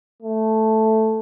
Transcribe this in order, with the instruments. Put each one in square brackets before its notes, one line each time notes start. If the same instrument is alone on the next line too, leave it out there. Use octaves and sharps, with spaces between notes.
[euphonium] A3